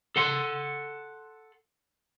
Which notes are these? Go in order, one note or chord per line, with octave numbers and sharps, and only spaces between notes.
A4 F#5 C6